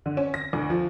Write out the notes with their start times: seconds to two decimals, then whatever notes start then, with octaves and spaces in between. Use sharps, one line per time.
0.06 D3
0.17 C#4
0.34 A#6
0.53 D2
0.70 F3